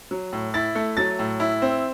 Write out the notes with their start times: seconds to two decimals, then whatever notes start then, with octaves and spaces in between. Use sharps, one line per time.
0.11 F#3
0.33 A2
0.54 E4 A6
0.75 A3
0.97 F#3 A6
1.19 A2
1.40 E4
1.62 C4